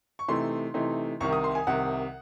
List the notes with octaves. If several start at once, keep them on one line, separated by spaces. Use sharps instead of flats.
C#6
C3 E3 A3 D#4 C6
C3 E3 A3 D#4
C2 C3 D#3 C#6
D#6
C6
G#5
C2 C3 D#3 F#5